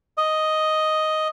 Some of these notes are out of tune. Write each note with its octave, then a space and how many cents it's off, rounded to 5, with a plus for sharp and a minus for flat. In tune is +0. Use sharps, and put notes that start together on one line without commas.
D#5 +5